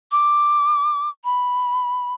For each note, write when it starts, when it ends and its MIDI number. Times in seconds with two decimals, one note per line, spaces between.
0.12 1.09 86
1.24 2.14 83